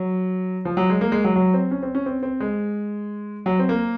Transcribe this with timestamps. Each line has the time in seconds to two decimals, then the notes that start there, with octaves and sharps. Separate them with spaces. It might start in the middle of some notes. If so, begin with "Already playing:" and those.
Already playing: F#3
0.65 F3
0.77 F#3
0.90 G#3
1.01 A#3
1.12 G#3
1.24 F#3
1.36 F#3
1.54 C4
1.71 C#4
1.83 C4
1.95 C#4
2.06 C4
2.23 C4
2.40 G#3
3.46 F#3
3.59 C4
3.69 A#3